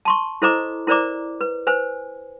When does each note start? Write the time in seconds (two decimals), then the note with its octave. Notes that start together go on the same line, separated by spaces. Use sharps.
0.05 A5 C6 C#6
0.42 E4 A4 C5 D#5 A#5 D6
0.87 E4 A#4 C5 D5 A#5 D6
1.41 B4
1.67 B4 C5 G#5